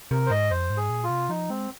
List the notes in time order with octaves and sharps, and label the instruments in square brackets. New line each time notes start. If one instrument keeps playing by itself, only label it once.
[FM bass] C3 [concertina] A#4
[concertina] C5
[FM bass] G#2 [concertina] D#5
[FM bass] F2 [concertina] C5
[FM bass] G#2
[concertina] G#4
[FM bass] A#2
[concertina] F4
[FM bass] C3
[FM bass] F3 [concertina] D#4
[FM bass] G#3 [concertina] C4